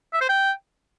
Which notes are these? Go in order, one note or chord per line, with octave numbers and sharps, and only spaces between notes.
E5
C5
G5